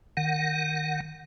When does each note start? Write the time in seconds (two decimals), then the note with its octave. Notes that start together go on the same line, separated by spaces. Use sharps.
0.17 D#3 F#5